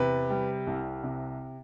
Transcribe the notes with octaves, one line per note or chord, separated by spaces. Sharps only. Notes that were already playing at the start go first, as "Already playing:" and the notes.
Already playing: E2 C3 B4
G3
C2
C3